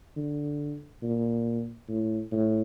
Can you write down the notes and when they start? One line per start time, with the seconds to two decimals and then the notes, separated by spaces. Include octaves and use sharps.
0.17 D3
1.03 A#2
1.89 A2
2.32 A2